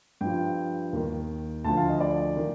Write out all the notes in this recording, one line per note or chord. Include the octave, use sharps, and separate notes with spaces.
G2 F3 G5
D#2 D#3
D2 D3 F3 A5
F5
D#5
D5
D#3